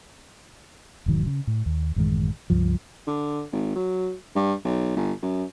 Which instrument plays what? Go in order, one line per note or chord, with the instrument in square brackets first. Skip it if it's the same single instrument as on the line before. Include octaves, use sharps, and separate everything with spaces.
[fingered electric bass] E1 G#2 D#3 F#3
C#3
A2
D#2
A1 F#2 D#3 G#3
C#2 G2 F3
[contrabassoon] D3
G#1
F#3
G2
B1
G1
F#2